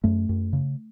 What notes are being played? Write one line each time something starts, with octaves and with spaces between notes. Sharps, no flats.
F#2 A3
F#2
C#3